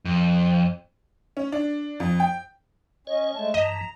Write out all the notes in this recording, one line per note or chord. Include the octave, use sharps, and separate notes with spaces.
F2
C#4
D4
F2
G5
C#4 C#5 D#5
G#3 A3 A5
G2 E3 D#5 A#5